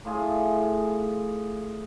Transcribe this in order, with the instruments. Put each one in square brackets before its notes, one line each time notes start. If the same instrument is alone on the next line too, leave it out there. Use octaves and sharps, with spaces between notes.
[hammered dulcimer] A2 F4 G#4